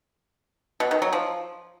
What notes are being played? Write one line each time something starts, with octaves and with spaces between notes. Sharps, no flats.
B2
D#3
F#3
F3